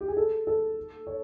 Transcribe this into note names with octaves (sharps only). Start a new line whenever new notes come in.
G4
G#4
A4
A4
C#5